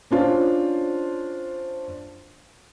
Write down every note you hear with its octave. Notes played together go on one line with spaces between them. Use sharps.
C#4 D4 F4 C5